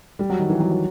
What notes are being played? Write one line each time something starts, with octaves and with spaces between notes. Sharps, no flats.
G3
F#3
D#3
E3
F#3
F#3